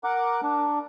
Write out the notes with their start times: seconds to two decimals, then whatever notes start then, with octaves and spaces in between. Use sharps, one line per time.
0.04 A#4 F#5 D6
0.43 D4